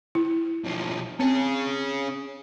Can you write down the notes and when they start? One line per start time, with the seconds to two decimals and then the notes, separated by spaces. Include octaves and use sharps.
0.15 E4
0.64 B1 F3
1.20 C4 C#4 G#4